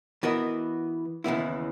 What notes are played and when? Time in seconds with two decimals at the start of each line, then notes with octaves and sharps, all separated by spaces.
0.23 E3 B3 F#4 A#4 D#5
1.24 D#2 C#3 E3 B3 E4